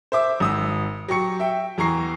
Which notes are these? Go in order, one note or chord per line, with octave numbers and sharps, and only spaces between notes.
C5 E5 D6
G#1 D#6 E6
F#3 G4 C#6 C#7
E5 G5
E2 E3 A#5 C#6 C7